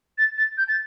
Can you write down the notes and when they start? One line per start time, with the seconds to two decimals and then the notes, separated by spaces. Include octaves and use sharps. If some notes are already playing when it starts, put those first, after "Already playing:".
0.18 A6
0.37 A6
0.58 G6
0.68 A6